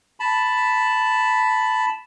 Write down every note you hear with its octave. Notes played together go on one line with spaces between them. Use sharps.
A5 B5